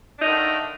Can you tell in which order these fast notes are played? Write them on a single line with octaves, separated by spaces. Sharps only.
D4 D#4 D#3 D3 A3